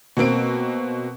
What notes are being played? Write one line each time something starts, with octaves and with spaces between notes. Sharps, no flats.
B2 A#3 C4 D7